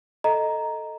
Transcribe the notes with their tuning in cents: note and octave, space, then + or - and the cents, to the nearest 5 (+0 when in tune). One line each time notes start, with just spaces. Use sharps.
A4 +0 D#5 +0 A#5 +0